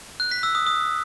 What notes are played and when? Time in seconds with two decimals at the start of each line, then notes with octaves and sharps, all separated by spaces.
0.20 F#6
0.31 B6
0.43 E6
0.55 D#6
0.67 D#6